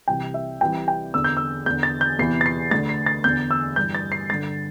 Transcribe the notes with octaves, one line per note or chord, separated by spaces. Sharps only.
C2 C3 E3 G5
E5
C2 C3 E3 G5
G5
E2 D3 E6
G6
E6
E2 D3 G6
A6
G6
E2 C3 E3 C7
A6
C7
D2 D3 A6
C7
A6
E2 D3 G6
E6
G2 E3 G6
A6
C7
G2 D3 A6